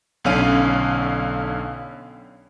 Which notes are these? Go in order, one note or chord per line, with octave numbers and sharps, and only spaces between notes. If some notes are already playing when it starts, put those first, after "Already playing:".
B1 D3 C#4 F5 D#7